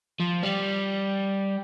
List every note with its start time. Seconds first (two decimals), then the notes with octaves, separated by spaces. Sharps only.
0.20 F3
0.43 G3